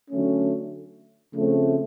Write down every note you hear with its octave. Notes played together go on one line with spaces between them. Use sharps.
D3 F#3 A3 C#4
C#3 F3 A3 C4